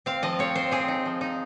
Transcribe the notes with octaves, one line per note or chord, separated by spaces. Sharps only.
C4 F5
F3 D#5
C4 C#5
C4 C5
C4 G#4
D#4
F3
D#4